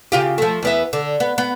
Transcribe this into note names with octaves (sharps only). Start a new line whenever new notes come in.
C#3 F4 G4
F3 A3
E2 B3 E5
D3
B3
B3